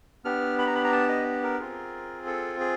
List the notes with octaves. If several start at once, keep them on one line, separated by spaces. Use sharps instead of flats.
B3 D4 G4 F6
B5
A#5
B5
A#5
A5
D#5
A#4
C4 F4 G#4
A4
G#4